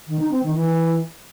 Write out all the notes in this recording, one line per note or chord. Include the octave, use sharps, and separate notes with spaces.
D#3
D#4
C4
D#3
E3